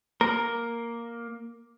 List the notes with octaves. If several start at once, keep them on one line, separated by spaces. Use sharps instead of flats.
A#3 A#4